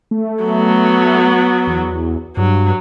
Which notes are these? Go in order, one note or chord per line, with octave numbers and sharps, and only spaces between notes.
A3
F#3 B3
E2
G2 F#3